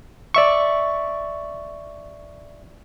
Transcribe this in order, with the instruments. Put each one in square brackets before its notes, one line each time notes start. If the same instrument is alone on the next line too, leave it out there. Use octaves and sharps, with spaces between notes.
[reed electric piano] D5 E5 C#6